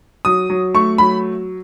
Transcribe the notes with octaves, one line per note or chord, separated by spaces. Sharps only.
F#3 D#6
F#3
A3 C#6
F#3 B5